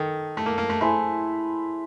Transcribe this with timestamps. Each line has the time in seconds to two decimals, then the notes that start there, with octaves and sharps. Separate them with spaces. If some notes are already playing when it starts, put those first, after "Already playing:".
Already playing: D#3 A4
0.37 A3
0.46 A#3
0.58 A#3
0.70 A3
0.81 A3 E4 G#4 C5